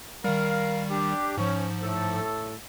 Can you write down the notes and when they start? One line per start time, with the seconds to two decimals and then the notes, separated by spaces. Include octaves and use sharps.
0.24 D#3 G3 A#4 F5
0.90 D4 G4
1.37 G#2 F3 C#4
1.81 A2 A4